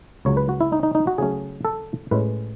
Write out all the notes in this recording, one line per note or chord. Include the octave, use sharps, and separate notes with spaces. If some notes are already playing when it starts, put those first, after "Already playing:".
C#2 C#3 F#3 C#5
B4
F#4
E4
D#4
D#4
D#4
F#4
C#3 F#3 A3 C#4 G#4
A4
A2 G#3 C#4 B4